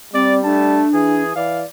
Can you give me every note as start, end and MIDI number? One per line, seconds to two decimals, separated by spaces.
0.14 0.82 55
0.14 0.43 60
0.14 0.36 74
0.44 0.85 57
0.44 1.23 62
0.44 0.85 81
0.94 1.34 52
0.94 1.35 68
1.35 1.63 52
1.35 1.64 74
1.35 1.64 77